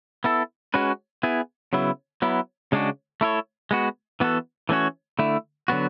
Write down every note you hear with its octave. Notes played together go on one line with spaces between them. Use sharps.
B3 E4 A4
G#3 C#4 F#4 B4
B3 E4 G#4
C#3 F#3 B3 E4
F#3 B3 E4
C#3 G#3 D4 F#4
A3 E4 A4 C#5
G#3 B3 F#4
E3 B3 F#4 A4
E3 A3 C#4 F#4 C#5
D3 A3 E4
D3 F#3 B3 F#4